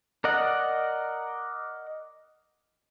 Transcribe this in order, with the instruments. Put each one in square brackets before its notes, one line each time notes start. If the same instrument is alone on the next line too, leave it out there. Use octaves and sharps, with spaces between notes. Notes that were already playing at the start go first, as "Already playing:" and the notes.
[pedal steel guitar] A#4 D5 D#5 F#5